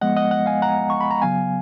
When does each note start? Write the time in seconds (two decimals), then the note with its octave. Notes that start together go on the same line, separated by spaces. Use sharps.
0.01 F3 G#3 B3 D#5 F#5
0.16 D#5 F#5
0.31 D#5 F#5
0.46 F5 G#5
0.62 F#5 A#5
0.90 C#6
1.01 B5
1.11 A#5
1.22 C#3 F#3 B3 F5 G#5